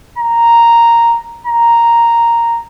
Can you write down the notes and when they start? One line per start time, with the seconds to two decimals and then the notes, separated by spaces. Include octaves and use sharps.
0.18 A#5
1.46 A#5